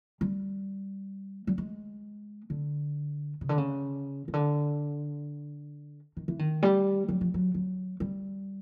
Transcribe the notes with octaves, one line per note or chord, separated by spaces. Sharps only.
G3
G3
G#3
D3
C#3
D3
C#3
C#3
D3
D#3
E3
D#3
G3
F#3
F3
F#3
F#3
G3